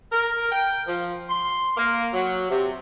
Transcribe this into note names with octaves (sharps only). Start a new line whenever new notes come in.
A#4
G5
F3
C6
A#3
F#3
C3